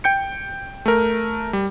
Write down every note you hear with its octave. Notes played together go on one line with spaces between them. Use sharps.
G5 G6 C#7
A3 A#4
G3